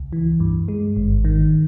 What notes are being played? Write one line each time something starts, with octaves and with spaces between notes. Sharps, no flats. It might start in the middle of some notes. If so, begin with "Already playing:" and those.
Already playing: C#2
E3
G2
G#3
G#1
D#3